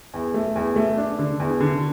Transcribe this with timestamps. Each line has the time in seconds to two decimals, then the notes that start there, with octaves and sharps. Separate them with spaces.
0.14 E2
0.34 A3
0.56 E2
0.76 A3
0.97 D4
1.19 D3
1.40 E2
1.60 D3